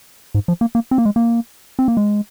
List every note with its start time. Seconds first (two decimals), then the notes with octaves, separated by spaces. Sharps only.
0.35 G#2
0.48 F3
0.61 A#3
0.75 A#3
0.91 C4
0.98 A#3
1.05 G#3
1.16 A#3
1.79 C4
1.88 A#3
1.97 G#3